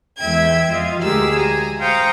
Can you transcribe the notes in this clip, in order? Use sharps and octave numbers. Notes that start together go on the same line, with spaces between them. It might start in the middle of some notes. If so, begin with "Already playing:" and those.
E2 G#3 E5 G5 G#6
F2 F4 D#5
D2 G#3 G4 G#4 A#4 E6
G#5 A#5
C5 F5 G5 A#5 C#6 D#6